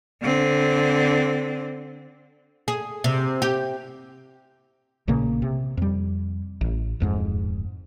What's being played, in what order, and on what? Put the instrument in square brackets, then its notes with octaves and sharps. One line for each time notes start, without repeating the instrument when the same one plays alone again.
[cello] D3 C4
[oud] G#4
C3
G4
[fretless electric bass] A#1 A#2 C#3 A#3
C3
F2 G3
A1
D1 F2 G#2